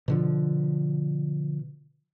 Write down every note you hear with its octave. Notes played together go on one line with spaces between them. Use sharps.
B2 D3 F3